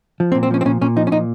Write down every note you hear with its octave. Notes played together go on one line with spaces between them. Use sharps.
F3
C4
A#2
C4
F3 C#4
C4
A#2 C#4
A#2 C#4
F3 D#4
C#4
A#2 D#4